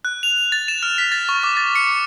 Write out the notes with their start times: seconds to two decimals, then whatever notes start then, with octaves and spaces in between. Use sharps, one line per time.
0.05 F#6
0.23 F7
0.38 F7
0.52 A6
0.68 E7
0.83 F6
0.98 B6
1.12 A6
1.29 C#6
1.43 D6
1.57 A6
1.75 C#7